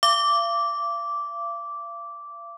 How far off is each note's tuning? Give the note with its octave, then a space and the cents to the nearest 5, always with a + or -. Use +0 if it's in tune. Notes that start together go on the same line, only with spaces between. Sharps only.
F5 -45 D6 -10